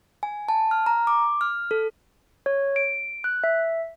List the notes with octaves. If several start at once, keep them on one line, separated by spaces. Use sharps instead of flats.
G#5
A5
F6
A#5
D6
F6
A4
C#5
D7
F#6
E5